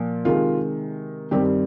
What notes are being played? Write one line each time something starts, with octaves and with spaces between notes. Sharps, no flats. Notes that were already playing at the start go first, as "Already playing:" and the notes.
Already playing: A#2 F3
C3 D#3 G#3 F4
G2 D#3 G3 C4 G4